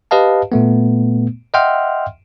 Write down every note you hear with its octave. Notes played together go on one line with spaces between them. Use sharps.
G4 B4 D#5 F5 A5
A#2 A3 B3
D#5 E5 F#5 G5 C6 F6